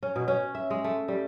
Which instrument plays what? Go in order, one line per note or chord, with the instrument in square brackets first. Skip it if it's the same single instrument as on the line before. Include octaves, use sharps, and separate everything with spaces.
[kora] C#4
B2
C#4
E5
G#3
A3
G3